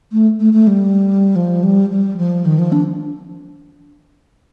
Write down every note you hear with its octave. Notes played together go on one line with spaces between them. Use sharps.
A3
A3
A3
G3
F3
G3
G3
F3
D#3
F3
D4